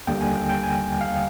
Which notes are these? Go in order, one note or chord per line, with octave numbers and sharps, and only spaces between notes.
D#2 D3 G3 A#3 G5
G#5
G5
G5
G#5
F5